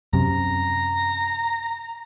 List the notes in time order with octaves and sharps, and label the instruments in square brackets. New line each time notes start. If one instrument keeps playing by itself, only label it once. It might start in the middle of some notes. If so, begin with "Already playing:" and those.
[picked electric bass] F#2 C3 [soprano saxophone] A#5